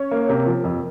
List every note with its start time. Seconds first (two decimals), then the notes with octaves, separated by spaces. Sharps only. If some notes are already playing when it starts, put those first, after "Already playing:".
Already playing: C#4 C#5
0.11 A#3
0.29 C3 A#4
0.46 F3
0.64 F2